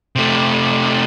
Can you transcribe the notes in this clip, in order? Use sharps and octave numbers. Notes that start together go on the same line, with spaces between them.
C3 A3